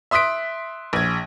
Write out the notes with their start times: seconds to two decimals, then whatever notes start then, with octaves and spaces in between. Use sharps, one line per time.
0.11 E5 C6 D#6 F#6 B6 D7
0.93 A#1 G#6